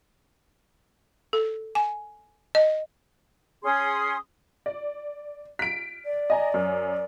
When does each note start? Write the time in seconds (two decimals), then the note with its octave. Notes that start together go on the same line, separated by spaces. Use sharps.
1.33 A4
1.75 G#5
2.55 D#5
3.64 C#4 G#4 C6 D#6
4.66 D5
5.59 B6 D7
6.05 D5
6.30 D#5 G#5 A#5
6.54 F#2